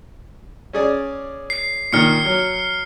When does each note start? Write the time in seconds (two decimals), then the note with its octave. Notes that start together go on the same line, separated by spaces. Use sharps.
0.73 C#4 G#4 D5
1.50 C7
1.93 A#2 D#3 F6 C#7
2.25 F#3